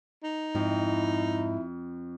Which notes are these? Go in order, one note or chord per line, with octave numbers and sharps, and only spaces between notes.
D#4
F2 G#2 E4